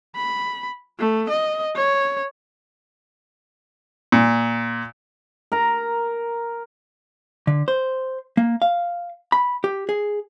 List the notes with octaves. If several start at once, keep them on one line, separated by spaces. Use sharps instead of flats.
B5
A3
D#5
C#5
A#2
A#4 A#5
D3
C5
A#3
F5
B5
G4
G#4